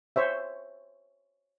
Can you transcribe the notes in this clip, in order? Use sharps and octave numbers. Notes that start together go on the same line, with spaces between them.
C5 C#5 E5